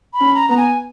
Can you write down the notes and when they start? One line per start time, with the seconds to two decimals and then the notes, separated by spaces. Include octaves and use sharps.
0.13 B5
0.21 C#4
0.35 A#5
0.49 B3 A#5
0.57 G#5